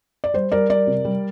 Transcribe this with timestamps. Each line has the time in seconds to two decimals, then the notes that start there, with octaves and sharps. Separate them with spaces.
0.24 D5
0.34 G3 C5
0.52 G3 A#4 D5
0.70 G3 A#4 D5
0.87 C3
1.05 G3